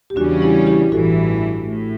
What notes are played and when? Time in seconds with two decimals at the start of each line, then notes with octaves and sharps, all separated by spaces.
0.10 G4
0.16 E2 C#3 G3 C#4 D4 F#4
0.41 E4 G4
0.67 E4 G4
0.92 A1 G2 E3 F#4 A4
1.67 A2